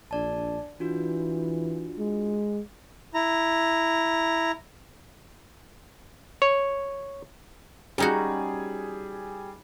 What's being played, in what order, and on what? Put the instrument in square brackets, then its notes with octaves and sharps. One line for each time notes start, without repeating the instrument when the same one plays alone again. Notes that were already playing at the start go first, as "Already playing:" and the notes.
[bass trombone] A#1 [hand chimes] D4 D5 A5
[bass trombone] E3 [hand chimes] D4 F4 F#4
[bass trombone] G#3
[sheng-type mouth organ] E4 A#5
[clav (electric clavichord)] C#5
[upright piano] G3 G#4 [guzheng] C#4 D#4 F#4